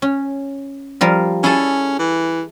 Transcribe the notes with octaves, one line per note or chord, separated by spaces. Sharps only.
C#4
F3 G3 A#4
C#4 E4 G#4 A4
E3